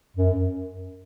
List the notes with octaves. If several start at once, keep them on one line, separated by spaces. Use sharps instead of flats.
F#2